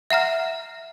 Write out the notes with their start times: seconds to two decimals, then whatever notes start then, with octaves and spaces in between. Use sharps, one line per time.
0.10 E5 F#5 A#5 F6